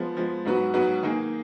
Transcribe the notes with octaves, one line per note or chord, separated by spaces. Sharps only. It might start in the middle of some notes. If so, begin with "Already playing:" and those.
Already playing: F3 G#3 B3
F3 G#3 B3
G#2 F#3 B3 F#4 B4
G#2 F#3 B3 F#4 B4
D#3 A#3 D#4 G#4